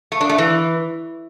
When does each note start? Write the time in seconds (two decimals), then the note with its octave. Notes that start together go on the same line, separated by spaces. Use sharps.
0.12 A3
0.21 D4
0.29 A3
0.38 E3